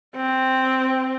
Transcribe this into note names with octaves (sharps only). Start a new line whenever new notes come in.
C4